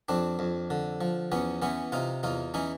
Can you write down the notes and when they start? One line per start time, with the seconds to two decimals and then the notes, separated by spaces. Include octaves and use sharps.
0.08 F2 C4 D4
0.39 F2
0.70 D3
1.01 F3
1.32 E2 B3 C#4
1.62 E3 B3 C#4
1.92 C3 D#4 F4
2.23 E2 D#4 F4
2.54 E3 C#4 D#4